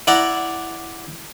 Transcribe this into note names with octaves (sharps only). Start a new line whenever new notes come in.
E4 D5 F#5 A#5